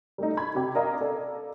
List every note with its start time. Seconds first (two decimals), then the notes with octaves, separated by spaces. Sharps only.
0.18 G3 A3 D#4
0.37 B5 G#6
0.55 C3 G4
0.75 A#4 D5 D#5 F5 A#5
1.01 A4 D5